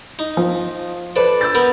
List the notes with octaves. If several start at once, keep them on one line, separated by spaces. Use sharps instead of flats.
D#4
F3
A4 B4 C5 D5
E6 G6 A6
B3 A#4 B4